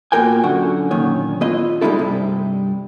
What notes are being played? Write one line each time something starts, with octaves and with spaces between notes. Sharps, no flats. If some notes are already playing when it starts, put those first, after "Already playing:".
A#2 B3 F#4 A#4 G5 G#5
F#2 D3 F#4 F#5
F#2 A#2 D#3 C#5
B3 E4 F4 D#5
B2 G3 G#3 D#4 E4 A4
G2 C3